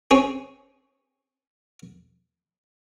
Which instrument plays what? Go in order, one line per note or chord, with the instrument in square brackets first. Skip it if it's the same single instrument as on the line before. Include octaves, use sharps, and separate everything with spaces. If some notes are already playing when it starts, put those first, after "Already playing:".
[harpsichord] C4 C#4 G#4